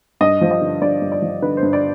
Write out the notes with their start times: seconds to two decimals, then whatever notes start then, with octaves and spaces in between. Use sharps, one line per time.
0.21 G2 D#5
0.41 F3
0.51 D#5
0.61 D3
0.82 G2 D5
1.02 G2
1.12 D5
1.22 F3
1.42 D3 B4
1.57 C5
1.63 G2
1.73 D5